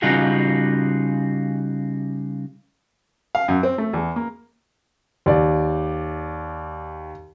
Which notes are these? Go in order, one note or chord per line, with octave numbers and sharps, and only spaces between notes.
C#3 G3 D#4 F4 F#4 G#4
F5
F#2
C4
A3
E2
A#3
D#2 D5